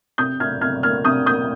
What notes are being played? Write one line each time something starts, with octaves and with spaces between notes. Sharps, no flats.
C3 D#6 G6
C3 F6 G#6
C3 F6 G#6
A#3 F6 G#6
C3 D#6 G6
A#3 D#6 G6